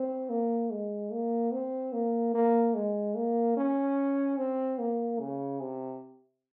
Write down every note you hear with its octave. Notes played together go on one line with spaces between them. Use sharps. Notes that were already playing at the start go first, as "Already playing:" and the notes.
Already playing: C4
A#3
G#3
A#3
C4
A#3
A#3
G#3
A#3
C#4
C4
A#3
C#3
C3